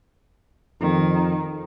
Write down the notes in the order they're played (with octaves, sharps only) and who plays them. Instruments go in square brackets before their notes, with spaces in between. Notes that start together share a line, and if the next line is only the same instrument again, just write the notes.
[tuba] F2 [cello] D#3